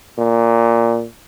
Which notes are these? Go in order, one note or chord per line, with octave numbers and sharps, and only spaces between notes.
A#2